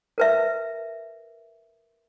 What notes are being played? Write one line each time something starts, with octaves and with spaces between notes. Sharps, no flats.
A#4 B4 E5